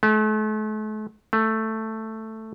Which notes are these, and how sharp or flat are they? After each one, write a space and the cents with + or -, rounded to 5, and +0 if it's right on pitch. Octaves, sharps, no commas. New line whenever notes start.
A3 -40
A3 +5